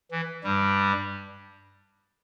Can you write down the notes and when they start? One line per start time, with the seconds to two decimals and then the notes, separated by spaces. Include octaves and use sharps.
0.11 E3
0.44 G2 G3